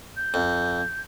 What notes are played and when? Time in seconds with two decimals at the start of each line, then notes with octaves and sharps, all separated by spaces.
0.17 G6
0.34 F2